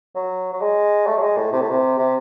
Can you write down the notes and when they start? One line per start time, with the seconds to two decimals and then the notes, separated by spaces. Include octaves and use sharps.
0.15 F#3
0.53 F#3
0.62 G#3
1.07 A3
1.17 F#3
1.22 G#3
1.37 A2
1.53 C3
1.60 A2
1.69 C3
1.98 C3